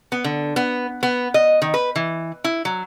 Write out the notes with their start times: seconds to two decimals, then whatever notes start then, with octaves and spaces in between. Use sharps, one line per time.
0.12 B3
0.24 D3
0.56 B3
1.03 B3
1.34 D#5
1.62 D#3
1.74 B4
1.96 E3
2.44 E4
2.65 F#3